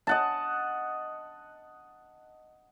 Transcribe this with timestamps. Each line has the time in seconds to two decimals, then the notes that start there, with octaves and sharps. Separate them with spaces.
0.07 D#5 F#5 A5